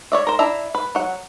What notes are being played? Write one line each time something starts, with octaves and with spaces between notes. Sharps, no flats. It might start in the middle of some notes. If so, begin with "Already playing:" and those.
C#5 D5 E5
A#4 C5
D4 E4 E5 A#5
B4
F#3 F#5